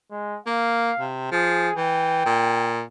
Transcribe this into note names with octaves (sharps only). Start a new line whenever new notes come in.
G#3
A#3 F5
C3
F3 G#4
E3 G5
A#2